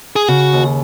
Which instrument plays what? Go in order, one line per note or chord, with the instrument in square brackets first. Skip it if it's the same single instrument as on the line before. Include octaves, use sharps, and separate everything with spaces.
[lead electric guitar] G#4
[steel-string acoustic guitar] C#3 [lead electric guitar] F#4
[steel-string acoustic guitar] D#2